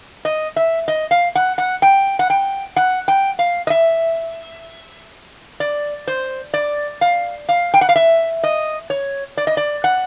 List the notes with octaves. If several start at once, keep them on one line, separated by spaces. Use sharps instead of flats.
D#5
E5
D#5
F5
F#5
F#5
G5
F#5
G5
F#5
G5
F5
D#5
E5
D5
C5
D5
F5
F5
G5
F#5
F5
E5
D#5
C#5
D5
D#5
D5
F#5